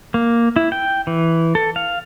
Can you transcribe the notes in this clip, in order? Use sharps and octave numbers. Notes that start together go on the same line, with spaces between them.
A#3
E4
G5
E3
A4
F5